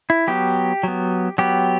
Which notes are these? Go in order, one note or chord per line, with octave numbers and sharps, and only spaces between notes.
E4
F#3 B3 G4
F#3 B3
F#3 B3 G4